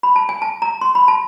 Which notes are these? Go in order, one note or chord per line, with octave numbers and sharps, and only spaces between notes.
B5
A5
G#5
A5
A#5
C6
B5
A5